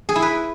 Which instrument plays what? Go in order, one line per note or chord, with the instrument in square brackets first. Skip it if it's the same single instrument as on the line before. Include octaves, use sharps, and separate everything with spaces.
[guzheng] G#4
E4
B4